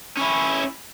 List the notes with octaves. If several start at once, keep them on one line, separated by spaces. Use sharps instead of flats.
C#4 E4